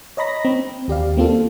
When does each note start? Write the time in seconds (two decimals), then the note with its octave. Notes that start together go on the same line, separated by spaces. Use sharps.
0.17 C#5 D#5 A#5 B5 A#6
0.45 C4
0.88 D#2 G4 D5 F5
1.17 A#3 C4 F4 A4